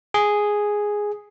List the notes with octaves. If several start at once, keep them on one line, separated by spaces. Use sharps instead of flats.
G#4